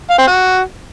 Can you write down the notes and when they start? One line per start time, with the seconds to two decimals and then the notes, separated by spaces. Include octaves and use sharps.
0.10 F5
0.19 C4
0.27 F#4